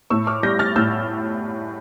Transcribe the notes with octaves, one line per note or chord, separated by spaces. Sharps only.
A2 C#6 E6
D6 F6
G3 G6 A#6
F6 A6
A2 E6 G6